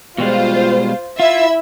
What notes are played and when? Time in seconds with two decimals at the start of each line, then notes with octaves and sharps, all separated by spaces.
0.18 B2 G3 G#3 F4 C5
1.20 E4 F4 E5